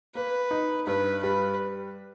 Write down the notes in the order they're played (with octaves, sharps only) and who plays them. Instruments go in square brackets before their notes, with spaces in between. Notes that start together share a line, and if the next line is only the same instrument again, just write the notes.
[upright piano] A#3 [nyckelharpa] B4
[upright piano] D#4
[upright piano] G2 [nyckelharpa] B4
[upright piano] G3 [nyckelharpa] B4